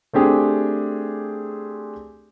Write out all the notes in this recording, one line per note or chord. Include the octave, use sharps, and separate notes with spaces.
A3 C4 D4 G4 G#4